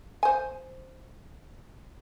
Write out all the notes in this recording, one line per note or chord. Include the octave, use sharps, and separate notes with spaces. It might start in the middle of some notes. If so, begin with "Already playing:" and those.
C5 G#5